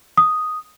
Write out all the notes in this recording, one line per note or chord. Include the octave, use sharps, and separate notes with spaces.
D#6